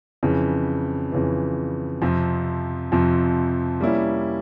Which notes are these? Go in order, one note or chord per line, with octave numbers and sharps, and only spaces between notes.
F2 C#3 E3
F2 C#3 E3
F2 C3 F3
F2 C3 F3
G3 A#3 C#4 E4